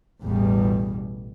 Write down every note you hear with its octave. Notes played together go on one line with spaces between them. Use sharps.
A1 E2 B2 G3